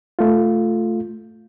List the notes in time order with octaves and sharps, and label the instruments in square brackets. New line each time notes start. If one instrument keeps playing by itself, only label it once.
[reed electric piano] A3 F4